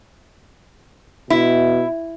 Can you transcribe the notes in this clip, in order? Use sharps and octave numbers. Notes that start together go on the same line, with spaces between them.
B2 E4